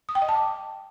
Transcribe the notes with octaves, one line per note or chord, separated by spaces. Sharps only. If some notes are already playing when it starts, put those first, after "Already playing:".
D#6
G5
D#5
A5
D6